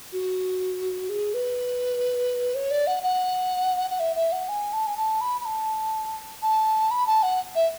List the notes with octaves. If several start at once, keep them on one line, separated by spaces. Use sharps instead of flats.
F#4
G#4
B4
C#5
D5
F#5
F#5
F#5
E5
E5
F#5
G#5
A5
G#5
A5
B5
B5
A5
A5
B5
A5
F#5
E5